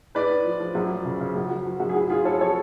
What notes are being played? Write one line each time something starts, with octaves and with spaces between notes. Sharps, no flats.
A2 B4 D5
A2
F3
F3
F#2
F3
C#3
C#3
F#2
F3 F#4
F3
F#2 F#4
G#4
A2 F#4
A2 F4 G#4
A2 A4 C#5
F3 A4 C#5